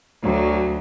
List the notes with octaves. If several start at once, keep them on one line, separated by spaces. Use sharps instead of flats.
D2 F#3